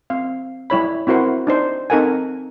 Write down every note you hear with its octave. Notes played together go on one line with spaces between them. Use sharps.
C4 F5
G3 E4 C#5 B5
C4 E4 F#4 A#4 C5 F#5
D4 D#4 C5
C4 D#4 A4 A#4 F#5 G#5